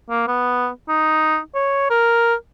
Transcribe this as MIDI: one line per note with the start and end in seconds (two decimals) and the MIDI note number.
0.10 0.24 58
0.28 0.69 59
0.88 1.38 63
1.55 1.87 73
1.90 2.35 70